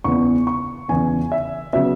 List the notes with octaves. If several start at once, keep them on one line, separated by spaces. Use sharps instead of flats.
E2 C#3 E3 B3 C#6
C#6
E2 C#3 E3 B3 G#5
E5
C#3 F#3 B3 E5